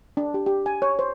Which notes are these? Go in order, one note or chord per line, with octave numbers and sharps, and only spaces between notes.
D4
G4
G4
G#5
C#5
C5